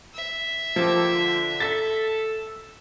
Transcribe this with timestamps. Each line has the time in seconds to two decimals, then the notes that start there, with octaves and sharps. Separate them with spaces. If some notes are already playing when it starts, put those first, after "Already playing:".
0.14 E5
0.76 F3 A#3 G4 A4
1.13 D3
1.60 A4 A6 B6